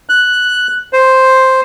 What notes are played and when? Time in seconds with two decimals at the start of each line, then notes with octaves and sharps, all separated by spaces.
0.09 F#6
0.93 C5